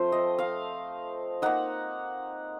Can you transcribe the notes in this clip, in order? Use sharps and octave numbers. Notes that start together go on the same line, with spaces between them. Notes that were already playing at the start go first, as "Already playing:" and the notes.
Already playing: F3 A3 C4 C5
D#5
F5
A#3 D#4 F#5